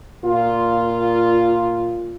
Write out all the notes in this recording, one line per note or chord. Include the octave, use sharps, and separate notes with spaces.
A#2 F4